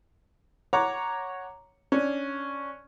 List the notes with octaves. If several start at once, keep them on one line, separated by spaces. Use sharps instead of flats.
C#5 F#5 A#5 D6
C#4 D4